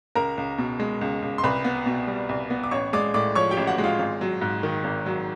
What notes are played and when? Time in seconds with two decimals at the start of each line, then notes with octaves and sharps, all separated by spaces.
0.15 C#2 A#4 A#5
0.38 C#2
0.58 B2
0.80 G#3
1.01 C#2
1.22 C#2
1.38 C6
1.44 C2 B4 B5
1.64 B3
1.86 B2
2.07 G3
2.29 C2
2.50 B3
2.64 D6
2.71 A1 C#5 C#6
2.93 G#3 D5 D6
3.14 A2 D5 D6
3.35 F3 C#5 C#6
3.51 G4 G5
3.57 A1
3.67 F#4 F#5
3.78 G#3
3.84 F4 F5
3.99 G#1
4.21 F#3
4.42 G#2
4.63 D#3
4.84 G#1
5.06 F#3